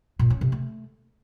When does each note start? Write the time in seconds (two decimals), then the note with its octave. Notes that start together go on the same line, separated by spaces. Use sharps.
0.19 A#2
0.30 C#4
0.41 C3
0.52 A3